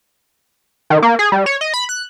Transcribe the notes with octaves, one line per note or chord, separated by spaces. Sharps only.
D#3
A#3
G#4
G3
C#5
D#5
B5
F#6